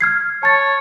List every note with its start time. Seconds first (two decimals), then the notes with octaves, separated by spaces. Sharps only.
0.01 F6 G#6 C7
0.43 C#5 A5 A6